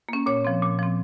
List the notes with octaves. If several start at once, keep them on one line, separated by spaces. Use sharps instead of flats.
A#3 C#4
A#2 C#5
F3 C4
A#2
F3 C4